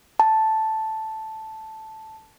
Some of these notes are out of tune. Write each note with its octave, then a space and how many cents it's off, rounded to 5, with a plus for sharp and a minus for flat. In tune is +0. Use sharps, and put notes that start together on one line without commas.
A5 +0